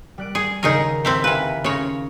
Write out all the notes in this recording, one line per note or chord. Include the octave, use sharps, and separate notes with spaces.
G3 F#6 D7
G#4
D#2 C#3 D#4 G#4 A#4
C4 E4 G4
C3 B4 F5 G#5 B5
C#3 C#5 C6 A#6